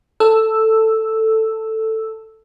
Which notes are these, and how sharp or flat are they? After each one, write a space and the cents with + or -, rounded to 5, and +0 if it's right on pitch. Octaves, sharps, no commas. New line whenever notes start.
A4 +10 E6 +0